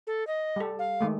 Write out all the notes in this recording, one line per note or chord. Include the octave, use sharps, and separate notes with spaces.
A4
D#5
G3 A4
F5
D#3 G#3 A3